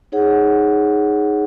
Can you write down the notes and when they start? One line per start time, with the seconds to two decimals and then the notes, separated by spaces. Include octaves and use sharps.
0.12 D#4 G#4 C#5 F#5